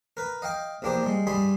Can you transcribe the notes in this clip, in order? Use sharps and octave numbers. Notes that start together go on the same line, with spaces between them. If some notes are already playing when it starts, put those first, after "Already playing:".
A#4 B4
D#5 F5 G5 D6
A#1 E2 A#3 D4 G4 C5
G3 G#3
G2 G3 G#4 B5 C6